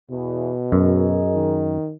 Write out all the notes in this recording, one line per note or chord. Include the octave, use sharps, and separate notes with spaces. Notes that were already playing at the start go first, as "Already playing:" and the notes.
E2 B2
F#2 G#4 A#4 D#5
D#3